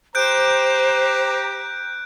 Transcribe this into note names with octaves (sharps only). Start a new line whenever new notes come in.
G4 C5 A#5 F#6 G6 D7